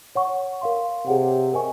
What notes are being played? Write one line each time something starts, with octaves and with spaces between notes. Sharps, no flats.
C#5 F#5 C#6
A#4 F5 C6
C3 G#4 C#5 F#5
A#4 D#5 G#5 C#6